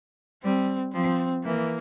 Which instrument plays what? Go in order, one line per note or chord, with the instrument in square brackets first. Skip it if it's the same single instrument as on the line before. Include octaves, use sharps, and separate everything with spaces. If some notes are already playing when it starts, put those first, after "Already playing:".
[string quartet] G3 [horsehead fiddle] C4
[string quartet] F3 [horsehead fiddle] C4
[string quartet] E3 [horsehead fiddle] A#3